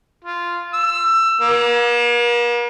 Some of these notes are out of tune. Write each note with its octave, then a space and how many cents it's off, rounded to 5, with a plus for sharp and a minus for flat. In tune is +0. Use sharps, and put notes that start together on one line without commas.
F4 -10
E6 +20
A#3 +45